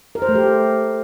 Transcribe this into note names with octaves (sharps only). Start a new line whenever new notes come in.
A#4
C5
A3
G4